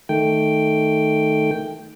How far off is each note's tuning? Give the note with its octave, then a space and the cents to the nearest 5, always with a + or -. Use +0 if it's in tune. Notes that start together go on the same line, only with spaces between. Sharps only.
D#3 +0 A3 +0 G5 +0